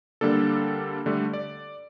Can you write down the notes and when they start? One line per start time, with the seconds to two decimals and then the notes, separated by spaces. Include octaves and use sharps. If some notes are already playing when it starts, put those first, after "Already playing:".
0.21 D3 G3 A#3 D4 A4
1.06 D3 G3 A3
1.34 D5